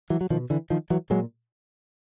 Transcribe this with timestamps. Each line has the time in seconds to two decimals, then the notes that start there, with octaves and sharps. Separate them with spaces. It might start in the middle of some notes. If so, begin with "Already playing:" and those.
0.10 E3 F#3
0.21 F#3
0.30 B2 D#3 F3
0.50 D3 E3
0.70 D#3 F3
0.90 E3 F#3
1.10 A#2 F#3 G#3